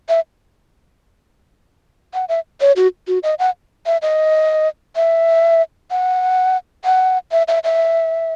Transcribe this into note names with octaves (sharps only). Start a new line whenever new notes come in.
E5
F#5
E5
C#5
F#4
F#4
D#5
F#5
E5
D#5
E5
F#5
F#5
E5
E5
E5